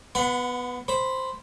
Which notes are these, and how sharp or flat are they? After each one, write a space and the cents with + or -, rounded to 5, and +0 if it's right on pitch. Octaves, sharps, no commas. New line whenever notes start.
B3 +0 F#5 -20 B5 +35
C5 +0 B5 +0